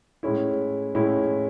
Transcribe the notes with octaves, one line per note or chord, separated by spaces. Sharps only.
A2 G#3 C#4 E4
A2 G#3 C#4 E4